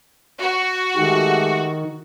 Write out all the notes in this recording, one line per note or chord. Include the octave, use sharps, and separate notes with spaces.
F#4
D#3 G#3 A3 G4